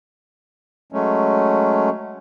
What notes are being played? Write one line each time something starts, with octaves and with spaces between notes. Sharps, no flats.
F#3 G#3 A3 C#4